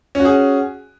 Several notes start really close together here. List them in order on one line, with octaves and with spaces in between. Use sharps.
C#4 F#4 G#4